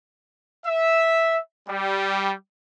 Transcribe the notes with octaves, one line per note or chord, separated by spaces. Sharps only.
E5
G3